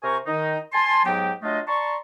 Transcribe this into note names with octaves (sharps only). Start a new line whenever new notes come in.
C3 A#4 C5 G#5 A#5 C#6
D#3 D#4
G#5 A5 C6
G#2 F#3 B3 D#4 G4 G5
F#3 A3 D4 F4 D#5
D5 A5 A#5 C6 C#6